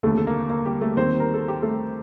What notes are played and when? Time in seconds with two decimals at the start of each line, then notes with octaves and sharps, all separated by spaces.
0.03 F1 D#2 D3 A3 A4
0.18 A4
0.27 A#3 A#4
0.50 A#3 A#4
0.65 G3 G4
0.81 A3 A4
0.97 D#2 D#3 G3 C4 C5
1.20 A#4
1.34 A4
1.48 G4
1.62 A3 A4